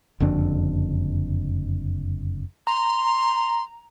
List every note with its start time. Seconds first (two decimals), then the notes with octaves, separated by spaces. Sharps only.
0.20 F#1 F2 D3 D4
2.67 A#5 C6